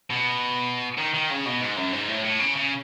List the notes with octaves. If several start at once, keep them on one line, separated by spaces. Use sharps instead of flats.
B2
D#3
D#3
C#3
B2
G#2
F#2
G#2
A2
A2
C#3
C#3